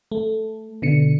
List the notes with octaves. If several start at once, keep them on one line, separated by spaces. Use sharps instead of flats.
A3
B2 D3 C#7